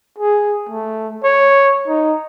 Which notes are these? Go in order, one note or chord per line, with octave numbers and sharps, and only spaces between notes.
G#4
A3
C#5
D#4